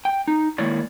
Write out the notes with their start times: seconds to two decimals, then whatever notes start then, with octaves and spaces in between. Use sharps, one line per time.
0.05 G5
0.28 D#4
0.58 D#3 G#3 A#3 E4 C#5 D5